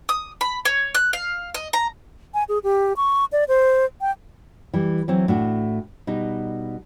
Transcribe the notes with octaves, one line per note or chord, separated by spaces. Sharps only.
D#6
B5
C#5
F#6
F5
D#5
A#5
G#5
G#4
G4
C#6
D5
C5
G5
E3 G3
E3 F#3 C4
A2 D4 F#4
B2 G3 D#4